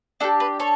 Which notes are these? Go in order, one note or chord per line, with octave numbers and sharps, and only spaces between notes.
D4 G4 A4
B4
A4 C#5